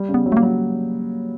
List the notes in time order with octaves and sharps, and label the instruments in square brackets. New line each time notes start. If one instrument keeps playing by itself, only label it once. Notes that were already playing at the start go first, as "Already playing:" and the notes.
Already playing: [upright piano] G3
C#3
[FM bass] B3
[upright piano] F#3
[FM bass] A3
A#3
[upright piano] F#3